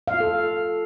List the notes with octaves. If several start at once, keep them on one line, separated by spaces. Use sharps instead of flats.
F5
F4
A4